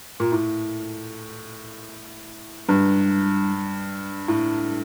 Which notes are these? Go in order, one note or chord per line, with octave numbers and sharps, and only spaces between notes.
A#2
A2
G2
A2